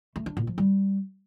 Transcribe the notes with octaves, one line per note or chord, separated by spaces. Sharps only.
A3
D4
A#2
F3
G3